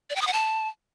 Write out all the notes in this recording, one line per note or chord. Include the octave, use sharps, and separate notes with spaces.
D5
G5
D#6
F#5
A5